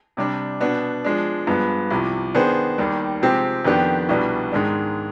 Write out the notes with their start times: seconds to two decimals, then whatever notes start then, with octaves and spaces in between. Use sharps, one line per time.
0.17 C3 G3 D4
0.60 B2 B3 D4
1.05 F3 G#3 D4
1.47 G2 F3 G#3 B3
1.90 C2 C3 F3
2.35 D#3 B3 D4 G#4 C5
2.78 D#2 D#3 G3
3.22 C3 F3 G#3 C4 G4
3.65 F2 D#3 B3 D4 G4
4.09 C2 B2 G3 B3 D4
4.52 G#2 D#3 G#3 D4